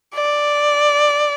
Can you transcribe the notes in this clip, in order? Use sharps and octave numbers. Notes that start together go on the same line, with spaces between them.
D5